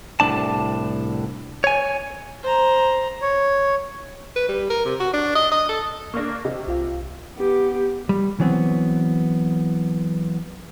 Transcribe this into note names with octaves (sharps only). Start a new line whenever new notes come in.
C2 A2 F#3 D4 A5
C#5 G#5
C5 A#5
C#5
B4
G3
A#4
C3
F#4
D4
D#5
D#5
A4
A#3 D4 C#6 F6 A#6
C3 D#5
C2 F4 F5
B3 G4
G3
E3 F#3 B3 C4